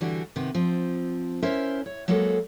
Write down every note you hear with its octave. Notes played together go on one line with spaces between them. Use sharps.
D3 E3 G3 D4 F#4
C3 D#3 B3
F3 C4
C#4 E4 A#4 C5 E5
C#5
F#3 G#3 A#3 F#4 A4 B4